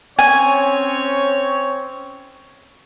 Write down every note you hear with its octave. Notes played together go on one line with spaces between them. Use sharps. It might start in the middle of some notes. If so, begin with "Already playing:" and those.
C4 C#4 C#5 G#5